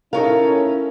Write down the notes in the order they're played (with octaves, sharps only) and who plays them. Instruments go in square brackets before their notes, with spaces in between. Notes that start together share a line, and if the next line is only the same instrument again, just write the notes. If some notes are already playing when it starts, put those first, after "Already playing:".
[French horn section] C#4 E4 [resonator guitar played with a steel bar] D#4 C#5 F5 [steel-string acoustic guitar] A4 A#4